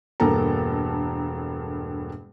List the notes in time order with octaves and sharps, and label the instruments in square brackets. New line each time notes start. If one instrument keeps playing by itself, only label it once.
[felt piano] E1 G2 A#3 A4 A5 A#5